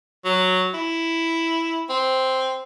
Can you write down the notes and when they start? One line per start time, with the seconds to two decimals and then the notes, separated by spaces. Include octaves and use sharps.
0.25 F#3
0.74 E4
1.89 C4